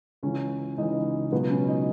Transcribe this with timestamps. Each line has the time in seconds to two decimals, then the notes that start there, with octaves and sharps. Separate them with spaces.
0.23 C#2 C#3 E3 C#4
0.78 C#2 C#3 E3 D#4
1.32 C#2 B2 F#3 B3
1.50 C#4
1.68 D#4